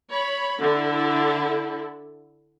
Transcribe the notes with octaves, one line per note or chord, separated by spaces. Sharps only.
C#5 B5
D3 E4 A4